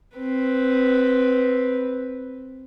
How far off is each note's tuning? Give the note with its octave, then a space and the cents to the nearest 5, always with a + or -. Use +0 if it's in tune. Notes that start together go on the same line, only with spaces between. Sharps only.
C4 +0 B4 +0